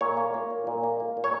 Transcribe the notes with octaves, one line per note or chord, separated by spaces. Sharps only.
A#2 C#5
A#3
A#3
A#2
A#2
A#3
A#3
A#2
C#5